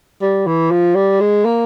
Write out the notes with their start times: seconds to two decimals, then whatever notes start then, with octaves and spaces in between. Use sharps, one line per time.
0.22 G3
0.47 E3
0.71 F3
0.95 G3
1.20 G#3
1.45 A#3